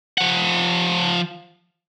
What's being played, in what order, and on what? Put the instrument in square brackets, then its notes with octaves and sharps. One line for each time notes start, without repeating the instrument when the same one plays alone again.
[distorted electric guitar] F3 F#5